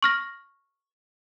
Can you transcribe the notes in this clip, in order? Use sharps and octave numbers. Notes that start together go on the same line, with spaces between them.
C#6 F6 A#6